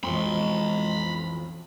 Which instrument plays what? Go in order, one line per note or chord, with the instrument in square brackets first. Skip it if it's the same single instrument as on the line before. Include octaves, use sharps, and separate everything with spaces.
[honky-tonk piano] B1 F2 [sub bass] E3 [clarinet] G#3 [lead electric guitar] B5 C6